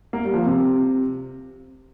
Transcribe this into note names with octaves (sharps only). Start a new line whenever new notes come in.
A#3
G3
F3
C3